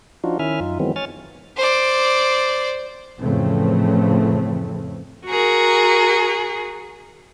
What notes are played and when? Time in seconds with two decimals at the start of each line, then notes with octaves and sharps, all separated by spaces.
0.24 F3 D4 D#4 F4 F#4
0.39 D#3 C#4 E4 E5 G#5 F6
0.60 F#2 D#4 F4
0.80 D#3 E3 F#3 G#3 B3 C4
0.96 C#5 G#5 F6 A6
1.56 C5 D5
3.20 F2 A2 C#3 E3 A3 C4
5.26 F#4 G#4 A#4